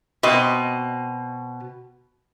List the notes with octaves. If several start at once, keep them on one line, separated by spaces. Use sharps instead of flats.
B2 C4 D#5